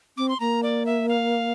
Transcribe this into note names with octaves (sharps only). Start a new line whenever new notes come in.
C4 D6
C6
A#3 A#5
D5
E5
F5